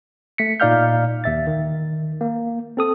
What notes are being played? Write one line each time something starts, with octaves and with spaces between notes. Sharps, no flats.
A3 B6 C#7
A#2 D#4 D5 F5 F6 G6
D#2 E5 A6
D#3
A#3
C4 A4 D#6